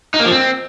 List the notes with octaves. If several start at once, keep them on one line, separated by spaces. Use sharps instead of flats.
D#4
A#3
F3
C4